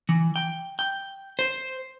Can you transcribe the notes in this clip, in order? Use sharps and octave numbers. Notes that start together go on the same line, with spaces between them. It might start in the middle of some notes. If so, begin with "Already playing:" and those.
E3
G5
G5
C5